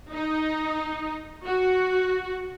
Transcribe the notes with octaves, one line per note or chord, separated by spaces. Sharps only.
D#4
F#4